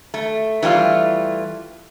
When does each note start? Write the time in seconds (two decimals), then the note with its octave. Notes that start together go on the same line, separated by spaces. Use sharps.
0.14 A3
0.62 E3 G3 A3 F4